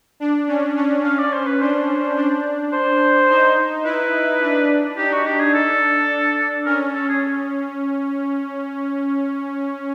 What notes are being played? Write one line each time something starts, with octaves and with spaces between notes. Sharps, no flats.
D4
C#4
C#4
C#4 F5
D5
C5
B4
D4 C5
D4
C5
D#4
E4 B4
D4
D#4 G4
F#4
D4 G4
G#4
A4
C#4 A#4
A4
G#4